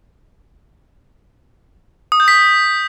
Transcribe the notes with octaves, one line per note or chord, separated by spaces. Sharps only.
D#6
G6
B6